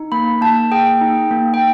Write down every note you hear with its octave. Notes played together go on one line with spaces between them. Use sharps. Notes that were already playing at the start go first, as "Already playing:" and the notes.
Already playing: D#4
A#3 B5
A#3 A5
G#4 G5
D#4
A#3
G5